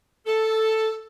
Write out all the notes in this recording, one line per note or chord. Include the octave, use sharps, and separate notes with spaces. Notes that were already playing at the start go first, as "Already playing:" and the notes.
A4